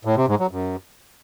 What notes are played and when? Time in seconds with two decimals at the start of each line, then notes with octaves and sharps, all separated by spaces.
0.05 A2
0.17 C3
0.28 G#2
0.40 F#3
0.51 F#2